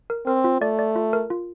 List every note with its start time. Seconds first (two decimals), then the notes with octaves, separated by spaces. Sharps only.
0.10 A#4
0.26 C4 A#4
0.44 F4
0.61 A3 D5
0.79 D5
0.95 F4
1.13 A#4
1.30 F4